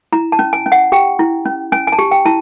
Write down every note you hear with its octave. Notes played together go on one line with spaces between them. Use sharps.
E4 A#5
A5
C#4
G#5
C#4
F#5
G4 G5
E4
C#4
C#4 G#5
G#5
A5
G4
G5
E4 A5